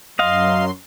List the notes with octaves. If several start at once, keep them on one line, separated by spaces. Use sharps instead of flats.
F#2 F#3 D#5 F5 C6